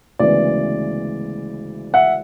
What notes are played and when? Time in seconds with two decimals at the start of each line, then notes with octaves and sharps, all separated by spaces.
0.19 D2 C#3 E3 G#3 B3 D5
1.94 E5 F#5